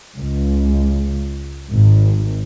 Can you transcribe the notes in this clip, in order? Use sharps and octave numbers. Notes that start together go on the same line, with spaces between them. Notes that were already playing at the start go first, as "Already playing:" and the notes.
C#2
G#1